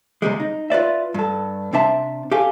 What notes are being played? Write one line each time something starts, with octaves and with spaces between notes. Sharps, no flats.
D#2 C3 G3 G#3
D#4
F4 B4 D5 E5
G2 A4
C3 C4 D4 E5 A5
G4 A4 F5 G#5